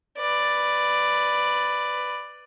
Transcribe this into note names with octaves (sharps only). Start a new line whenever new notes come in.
B4 D5